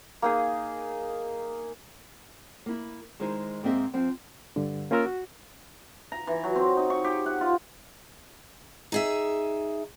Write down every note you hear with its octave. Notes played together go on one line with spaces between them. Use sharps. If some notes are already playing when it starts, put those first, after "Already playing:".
A#3 D#4 G#4
A#3 E4
D#3 G#3 D#4 E4 C5
G#2 A#3 C4 G#4 D#5 E5
F3 C4
G2 D3
A#3 C#4 F4 A#4 E6 F6
F#4
A#5
E3
F#3
C4
D#4
C#6
G4
F#5
F4
D#4 G#4 E5